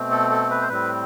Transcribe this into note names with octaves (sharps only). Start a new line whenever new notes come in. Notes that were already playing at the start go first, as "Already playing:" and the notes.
Already playing: B2 A3 C4
A4
A4
B4
C5
A2 G3 C4 B4